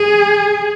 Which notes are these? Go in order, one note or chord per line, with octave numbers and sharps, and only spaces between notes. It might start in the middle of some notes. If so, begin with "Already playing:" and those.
Already playing: G#4